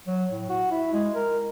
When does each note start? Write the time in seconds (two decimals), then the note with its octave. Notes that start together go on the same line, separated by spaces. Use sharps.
0.07 F#3
0.32 A2
0.49 F#4
0.71 E4
0.93 G#3
1.15 A#4